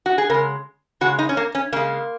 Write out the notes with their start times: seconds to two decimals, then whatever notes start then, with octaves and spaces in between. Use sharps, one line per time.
0.06 F#4
0.18 G#4
0.30 C#3 G#3 A#4
1.01 C#3 G#3 F#4
1.19 D#4
1.29 C#4
1.37 A#3
1.55 C#4
1.72 C#3 G#3 A#3